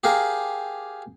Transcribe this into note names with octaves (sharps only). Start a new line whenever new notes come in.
G4 G#4 A#4 F5